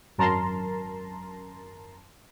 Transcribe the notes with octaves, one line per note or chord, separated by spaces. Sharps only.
G#1 F#2 A#4 A5 A#5 C6